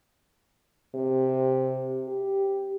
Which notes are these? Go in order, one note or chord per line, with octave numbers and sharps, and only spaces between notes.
C3
G4